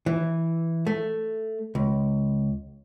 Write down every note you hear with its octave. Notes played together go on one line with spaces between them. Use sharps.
E3
A3
C#2